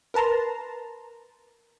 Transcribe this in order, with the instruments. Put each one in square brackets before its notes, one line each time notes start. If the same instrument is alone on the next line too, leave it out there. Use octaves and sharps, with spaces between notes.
[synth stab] A#4 B4 A5 A#5 C6